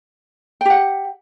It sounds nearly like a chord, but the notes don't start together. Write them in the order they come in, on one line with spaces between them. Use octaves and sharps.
G5 G4 F#5